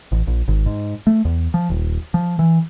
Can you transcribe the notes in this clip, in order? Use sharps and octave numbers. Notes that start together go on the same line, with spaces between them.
A1
A#1
G#1
G#2
A3
E2
F3
D#1
F3
E3